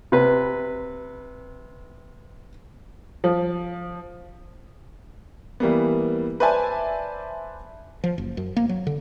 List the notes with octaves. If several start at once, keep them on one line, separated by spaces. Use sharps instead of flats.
C3 B4
F3
E3 G3 A#3 B3
B4 C5 D5 E5 G#5 A5
F3
F#1
F#2
A#3
F#3
D3